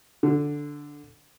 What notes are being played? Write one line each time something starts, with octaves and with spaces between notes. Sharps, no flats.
D3